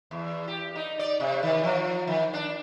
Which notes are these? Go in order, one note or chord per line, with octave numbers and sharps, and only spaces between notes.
E2
G4
D#4
D5
C3
D#3
F3
D#3
D4